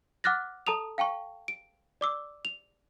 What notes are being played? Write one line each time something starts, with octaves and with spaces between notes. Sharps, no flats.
F#5 D6 F6 F#6 A6 A#6
A4 A5 A#5 D#6 F7
F5 G5 A5 C#6
D7
D5 D6 E6
F7